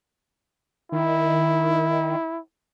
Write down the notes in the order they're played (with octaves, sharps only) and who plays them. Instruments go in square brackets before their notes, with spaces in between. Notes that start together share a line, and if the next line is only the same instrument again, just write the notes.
[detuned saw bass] D#3 [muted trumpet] E4